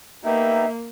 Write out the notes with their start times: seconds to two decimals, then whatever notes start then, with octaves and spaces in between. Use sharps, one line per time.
0.25 A#3 B3 D#4 G4 E5